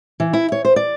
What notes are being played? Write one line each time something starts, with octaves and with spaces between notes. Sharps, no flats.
E3
E4
C#5
C5
D5